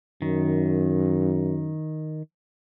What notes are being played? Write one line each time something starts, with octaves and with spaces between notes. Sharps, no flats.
F#2 D#3